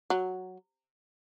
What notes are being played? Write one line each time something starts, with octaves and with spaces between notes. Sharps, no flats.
F#3